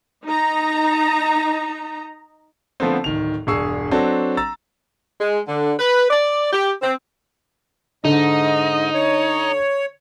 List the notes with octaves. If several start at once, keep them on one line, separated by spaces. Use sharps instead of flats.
D#4 A#5
D3 F3 A3 B3 C4
D1 D#3 F7
E1 G2 G#4 C#6 E6 C7
F#3 C4 D4 F#4 A4
A#5 E6 A6
G#3
D3
B4
D5
G4
C4
G#2 D3 D#4 D#5
C#5